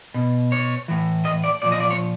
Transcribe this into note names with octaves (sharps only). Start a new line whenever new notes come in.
B2
C#5
A2 E3
D#5
D5
A#2 F3 D5
D#5
D5
C#5